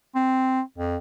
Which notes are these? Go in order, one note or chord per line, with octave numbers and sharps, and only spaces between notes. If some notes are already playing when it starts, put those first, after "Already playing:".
C4
F2